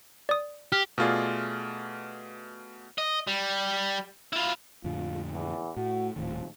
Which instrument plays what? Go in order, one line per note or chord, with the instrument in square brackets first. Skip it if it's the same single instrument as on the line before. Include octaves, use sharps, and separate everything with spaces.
[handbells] D5 D#6
[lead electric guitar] G4 [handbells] F6
[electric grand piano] B2 A3 F4 G#4 D5
[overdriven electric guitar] D#5
G3
E4 F4
[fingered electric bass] F2 A2 D3 [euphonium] F4
[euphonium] E2
[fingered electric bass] A2 [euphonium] F#4
[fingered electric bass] D#1 A2 D#3 [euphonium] F3